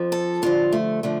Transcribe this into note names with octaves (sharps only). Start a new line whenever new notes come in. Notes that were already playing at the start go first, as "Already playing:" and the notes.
Already playing: F2 F3
A4
G2 D3 F3 F4
A3
D3 F3 A3